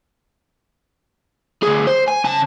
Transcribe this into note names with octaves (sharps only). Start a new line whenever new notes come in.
D2 G#4
C5
G#5
C#3 A5